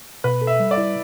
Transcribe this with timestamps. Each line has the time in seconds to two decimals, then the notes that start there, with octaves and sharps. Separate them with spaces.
0.24 B2 B4
0.41 A4
0.47 E5
0.60 G3
0.71 D5
0.77 E4